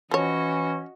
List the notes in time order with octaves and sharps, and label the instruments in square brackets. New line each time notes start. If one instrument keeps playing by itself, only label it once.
[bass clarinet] E3 [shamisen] F3 C#5 [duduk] C#4 [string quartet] F#4 D#5